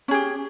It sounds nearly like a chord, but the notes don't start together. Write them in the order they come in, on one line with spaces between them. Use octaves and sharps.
C#4 G#4 G4